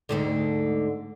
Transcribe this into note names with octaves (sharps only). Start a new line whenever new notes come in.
D2 G#2 D3